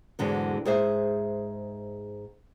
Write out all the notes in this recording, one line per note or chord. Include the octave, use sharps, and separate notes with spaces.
E2 G#2 D3 F#3
G#2 G#4 C5 E5